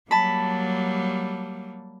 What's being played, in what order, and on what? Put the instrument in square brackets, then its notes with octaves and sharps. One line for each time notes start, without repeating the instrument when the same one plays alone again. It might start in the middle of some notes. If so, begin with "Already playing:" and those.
[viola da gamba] F#3 G3 A#3 [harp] A5 B5